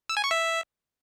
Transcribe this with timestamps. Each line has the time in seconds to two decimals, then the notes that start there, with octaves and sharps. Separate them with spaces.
0.10 E6
0.17 G#5
0.24 C#6
0.31 E5